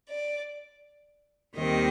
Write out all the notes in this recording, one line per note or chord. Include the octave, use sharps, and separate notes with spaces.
D5
D#2 D#3 G3 C4 D#5